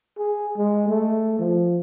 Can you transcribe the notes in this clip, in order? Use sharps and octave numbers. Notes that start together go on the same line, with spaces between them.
G#4
G#3
A3
F3